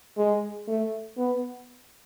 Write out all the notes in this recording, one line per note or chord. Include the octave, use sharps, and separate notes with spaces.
G#3
A3
B3